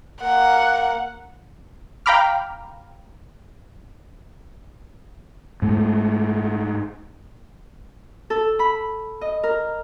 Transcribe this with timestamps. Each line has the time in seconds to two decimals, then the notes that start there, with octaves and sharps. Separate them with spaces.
0.22 A#3 A#4 F#5
2.06 F5 G5 A#5 B5 D6 F6
5.62 G#2 A3
8.30 A4
8.59 B5
9.21 D#5
9.43 A#4